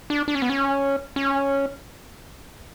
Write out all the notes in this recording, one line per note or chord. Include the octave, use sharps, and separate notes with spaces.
D4
D4
C#4
B3
C#4
C#4